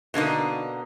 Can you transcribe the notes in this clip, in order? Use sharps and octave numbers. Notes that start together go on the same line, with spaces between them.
B2 D3 A#3 D#4